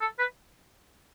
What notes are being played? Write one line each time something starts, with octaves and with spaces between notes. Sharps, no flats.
A4
B4